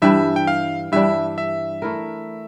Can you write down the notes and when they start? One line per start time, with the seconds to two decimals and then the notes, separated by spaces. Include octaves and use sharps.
0.02 G2 E3 G3 D4 E5
0.36 G5
0.47 F5
0.92 G2 E3 G3 D4 E5
1.38 E5
1.82 A3 E4 A#4